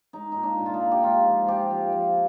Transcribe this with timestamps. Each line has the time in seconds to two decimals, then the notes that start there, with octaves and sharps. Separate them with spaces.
0.13 G#3 D#4
0.32 A#2 D#4
0.43 D4
0.59 A#2
0.66 F4
0.74 D#4
0.81 G#3
0.92 G4
1.02 G#3 F4
1.26 F3
1.47 F3 G4
1.71 F3
1.92 F3